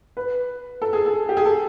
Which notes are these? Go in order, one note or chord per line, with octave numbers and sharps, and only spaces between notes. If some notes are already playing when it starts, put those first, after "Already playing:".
B4
A4
G#4
A4
G4
G#4
A4